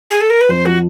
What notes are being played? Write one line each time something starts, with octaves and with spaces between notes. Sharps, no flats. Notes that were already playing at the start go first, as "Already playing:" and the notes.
G#4
A4
A#4
B4
F2 C5
F3 F#4